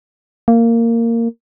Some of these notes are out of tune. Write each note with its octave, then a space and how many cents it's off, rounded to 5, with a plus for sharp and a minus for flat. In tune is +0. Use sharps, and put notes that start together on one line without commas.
A#3 -15